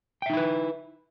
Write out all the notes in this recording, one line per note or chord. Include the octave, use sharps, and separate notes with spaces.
D#4 E4 B4 E5 G5